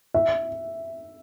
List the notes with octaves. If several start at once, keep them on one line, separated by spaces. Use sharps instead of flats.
E5